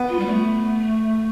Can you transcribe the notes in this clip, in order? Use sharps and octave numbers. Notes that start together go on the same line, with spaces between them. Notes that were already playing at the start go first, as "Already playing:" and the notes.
Already playing: B3
F4
G3
A3